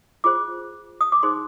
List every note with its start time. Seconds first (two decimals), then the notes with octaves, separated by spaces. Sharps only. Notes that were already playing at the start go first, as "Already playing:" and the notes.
0.24 F4 G#4 C5 D6
1.01 D#6
1.12 D6
1.23 D#4 G#4 C5 C6